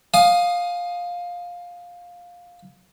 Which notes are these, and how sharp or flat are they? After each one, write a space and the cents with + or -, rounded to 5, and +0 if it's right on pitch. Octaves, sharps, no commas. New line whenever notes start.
F5 +15 G#5 +10 D#6 -10